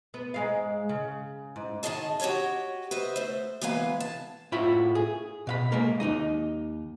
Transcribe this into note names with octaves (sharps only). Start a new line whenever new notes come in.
B3
G#2 G#3 F5
C#3
G#2
D#3 F3 G#4 D#5 A5
F#4 G4 A#4 C#5 D#5
B4 C5 D#5 E5
A3 C5
E2 E3 G#3 A#3 B4 F5
A5
A2 F4 F#4 E5 B5
G#4
B2 F5 B5
G#3 A#3 A#4
D#2 F#3 D#4 D#5